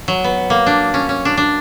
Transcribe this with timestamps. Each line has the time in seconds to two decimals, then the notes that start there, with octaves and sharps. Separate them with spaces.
0.08 F#3
0.24 B3
0.50 A#3
0.66 D4
0.94 C#4
1.09 C#4
1.25 D4
1.37 D4